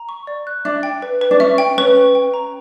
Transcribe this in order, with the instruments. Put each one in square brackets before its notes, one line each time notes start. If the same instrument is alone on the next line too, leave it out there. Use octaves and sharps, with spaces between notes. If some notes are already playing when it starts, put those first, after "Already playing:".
Already playing: [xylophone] A#5
C#6
D5
F#6
[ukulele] D4 [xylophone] E5
[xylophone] G5
B4
B4
[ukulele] D4
[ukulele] C#4 [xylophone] E5
[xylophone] G5
[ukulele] C#4 [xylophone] B4
[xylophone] B4
G5
A#5